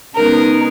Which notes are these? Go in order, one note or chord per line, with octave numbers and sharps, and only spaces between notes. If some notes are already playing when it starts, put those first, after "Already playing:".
C#3 G#3 B3 D#4 A#4